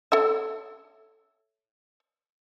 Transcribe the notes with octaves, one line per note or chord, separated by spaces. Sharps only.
A4 C#5 E5